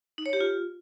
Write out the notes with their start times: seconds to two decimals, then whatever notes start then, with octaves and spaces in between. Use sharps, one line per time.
0.18 D#4
0.26 C#5
0.33 G4
0.40 F4